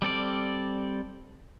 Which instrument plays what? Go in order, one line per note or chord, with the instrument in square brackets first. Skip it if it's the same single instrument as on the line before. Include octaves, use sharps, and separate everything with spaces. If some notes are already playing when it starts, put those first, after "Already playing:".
[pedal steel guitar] G3 C4 A4 D5